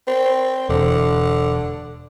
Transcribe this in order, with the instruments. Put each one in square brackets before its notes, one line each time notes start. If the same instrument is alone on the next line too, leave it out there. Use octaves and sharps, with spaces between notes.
[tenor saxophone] C4
[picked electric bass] E1 [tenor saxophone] D3